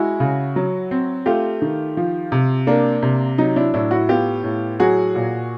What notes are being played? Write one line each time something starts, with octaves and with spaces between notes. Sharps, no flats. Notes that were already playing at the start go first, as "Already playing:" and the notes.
Already playing: G#3 E4 F#4
C#3
F#3
C4
A3 F4 G4
D#3
F3
C3
A#3 D4
C3
F#3 D#4
D4 E4
A2 D4 E4
E4 F#4
B3 F4 G4
A2
F#3 F#4 G#4
A#2